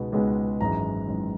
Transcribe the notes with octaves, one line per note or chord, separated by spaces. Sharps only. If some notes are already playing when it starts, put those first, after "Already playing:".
Already playing: C#2 B2 G#3 B3 D#4
C#2 B2 G#3 B3 D#4
G#1 F#2 E3 G#3 A#5
G#1 F#2 E3 G#3